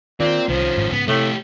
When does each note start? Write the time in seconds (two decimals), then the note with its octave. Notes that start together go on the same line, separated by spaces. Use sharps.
0.20 A#2 D#3 C4
0.49 C2 D#3 F3 C#4
0.77 G#1 G#2
0.92 G#2 C#3 B3
1.08 A2 C3 A3 G4